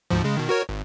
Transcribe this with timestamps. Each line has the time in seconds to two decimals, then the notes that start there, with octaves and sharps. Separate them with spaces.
0.11 D2 G#2 F3
0.24 C#3 G#3
0.37 B2 D#3
0.49 F#4 A#4 C#5
0.69 G#1